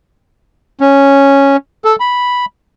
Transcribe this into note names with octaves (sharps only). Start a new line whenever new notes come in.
C#4
A4
B5